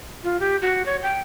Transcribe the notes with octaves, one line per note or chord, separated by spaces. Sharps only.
F4
G4
F#4
C#5
G5